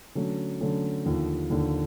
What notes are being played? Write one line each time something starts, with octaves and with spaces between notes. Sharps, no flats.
D3 F#3 A3 C#4
D3 F#3 A3 C#4
D#2 D3 F3
D#2 D3 F3